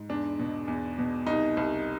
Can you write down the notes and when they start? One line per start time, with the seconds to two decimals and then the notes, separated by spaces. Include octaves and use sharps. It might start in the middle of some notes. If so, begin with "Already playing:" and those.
Already playing: G#2
0.09 E2 D4
0.39 B2
0.68 E2
0.98 B2
1.27 C2 D#4
1.57 C2